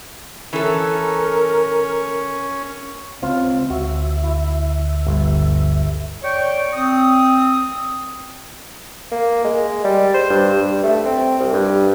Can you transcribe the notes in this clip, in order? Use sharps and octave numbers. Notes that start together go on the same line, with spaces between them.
E3 C#4 A4 A#4
C#2 C4 F4 F5
D2 F#4 E5
E4
G1
C#5 D5 G5 C#6
C4 D#6
A#3
G#3
G3
C5
G2
G2
A3
C4
C2
G2